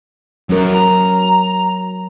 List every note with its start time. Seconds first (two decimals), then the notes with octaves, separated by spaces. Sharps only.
0.49 F#2 F#3 A#4
0.74 A#5